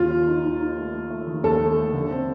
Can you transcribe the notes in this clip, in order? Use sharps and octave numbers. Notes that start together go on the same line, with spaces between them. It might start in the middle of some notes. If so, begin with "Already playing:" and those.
Already playing: D#2 F4
D#2
D#4
D#4
D#4
A3
A3
A3
D#3
D#2 A4
A3
A3
D3
C4